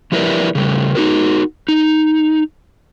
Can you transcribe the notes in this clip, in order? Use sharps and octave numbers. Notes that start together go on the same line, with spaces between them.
F3 G3 E4 A#4 B4 D5
C#3 G3 A3
D#4 F#4 A#4
D#4